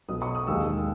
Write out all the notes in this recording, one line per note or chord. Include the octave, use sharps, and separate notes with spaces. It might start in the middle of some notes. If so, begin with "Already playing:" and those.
B1 B2 F#3 D#6
C#6
D#6
E1 D#2 D#3 G#3 E6